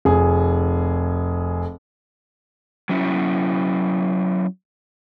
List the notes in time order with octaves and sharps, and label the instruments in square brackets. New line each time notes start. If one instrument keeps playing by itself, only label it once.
[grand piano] F1 G#4
[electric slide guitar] F#3 C#4 E4